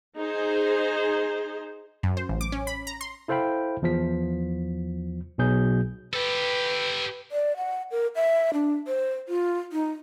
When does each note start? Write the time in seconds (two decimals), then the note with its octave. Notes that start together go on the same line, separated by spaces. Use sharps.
0.17 D#4 G#4 C5
2.03 F#2
2.17 C5
2.29 A1
2.41 D6
2.52 C#4
2.67 B5
2.87 A#5
3.01 C6
3.28 E4 A4 C5 F5 G5 B5
3.82 E2 F3 B6
5.38 B1 B2 F#3 G#4 G6
6.13 G4 A4 B4
7.32 D5
7.57 F#5
7.91 A#4
8.16 E5
8.54 D4
8.87 C5
9.29 F4
9.72 D#4